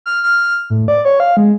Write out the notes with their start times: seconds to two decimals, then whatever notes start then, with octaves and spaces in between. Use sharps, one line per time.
0.06 F6
0.24 F6
0.70 A2
0.88 D5
1.05 C#5
1.20 F5
1.37 G#3